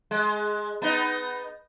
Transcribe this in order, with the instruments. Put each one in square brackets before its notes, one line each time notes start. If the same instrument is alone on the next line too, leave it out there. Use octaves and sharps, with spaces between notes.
[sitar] G#3
B3 D#4